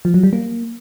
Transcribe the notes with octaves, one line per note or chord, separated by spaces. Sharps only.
F3
F#3
G3
A#3